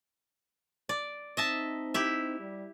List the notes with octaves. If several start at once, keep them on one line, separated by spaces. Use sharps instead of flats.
D5
C4 D#4 D#5 E5 A5
E4 G4 E5
G3